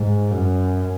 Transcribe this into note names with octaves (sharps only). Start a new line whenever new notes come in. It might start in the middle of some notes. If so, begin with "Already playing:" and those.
Already playing: G#2
F#2